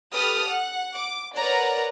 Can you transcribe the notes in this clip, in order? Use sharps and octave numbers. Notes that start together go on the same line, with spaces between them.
G4 A4 B4 D#6 F6
F#5
D6
A#4 B4 C#5 D5 F#5 A#5